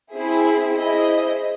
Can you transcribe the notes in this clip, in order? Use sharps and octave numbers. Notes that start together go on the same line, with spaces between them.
C4 E4 G#4
E4 G#4 C5 D#5